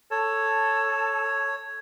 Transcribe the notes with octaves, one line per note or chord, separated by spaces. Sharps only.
A4 C#5